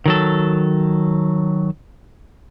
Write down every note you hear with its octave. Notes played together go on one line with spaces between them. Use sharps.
D#3 F#3 A4